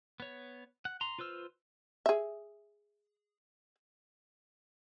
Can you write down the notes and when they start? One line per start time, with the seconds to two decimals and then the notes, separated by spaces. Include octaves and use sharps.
0.20 B3 C#5
0.85 F#5
1.01 A#5 C6
1.19 F4 B4 C5 E6 F6
2.06 G#4 E5